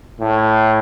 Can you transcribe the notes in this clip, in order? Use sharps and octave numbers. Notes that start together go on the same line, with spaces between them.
A2